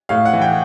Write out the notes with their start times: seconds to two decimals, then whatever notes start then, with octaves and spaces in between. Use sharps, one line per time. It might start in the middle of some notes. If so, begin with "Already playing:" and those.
0.09 A2 F5
0.25 F#5
0.33 E3
0.42 G5